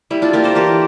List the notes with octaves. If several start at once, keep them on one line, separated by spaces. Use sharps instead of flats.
G3 E4
D4 F4
A#3 G4 A#4
A4 C5
E3 G4 A#4